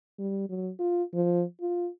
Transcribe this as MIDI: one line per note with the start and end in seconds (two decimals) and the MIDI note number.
0.19 0.47 55
0.49 0.70 54
0.80 1.03 65
1.14 1.43 53
1.61 1.89 65